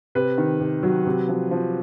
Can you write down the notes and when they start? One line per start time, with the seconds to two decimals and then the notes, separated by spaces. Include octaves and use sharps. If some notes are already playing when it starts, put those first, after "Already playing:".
0.15 C3 B4
0.38 D#3
0.60 C3
0.83 F#3
1.06 C3
1.28 F3
1.51 F3